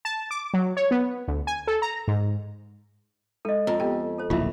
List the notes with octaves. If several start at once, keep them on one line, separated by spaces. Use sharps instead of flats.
A5
D6
F#3
C#5
B3
D2
G#5
A4
A#5
G#2
G#3 A4 D#5
F2 A#5
B3 G4 G5
A4 C5
D1 A#1 E4 F4 E5